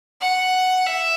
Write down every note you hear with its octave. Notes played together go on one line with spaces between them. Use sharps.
F#5
E5